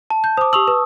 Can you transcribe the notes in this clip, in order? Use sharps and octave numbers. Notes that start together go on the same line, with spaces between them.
A5
G6
C5 D6 D#6
G4 C#6 D#6 E6 F7 F#7
B4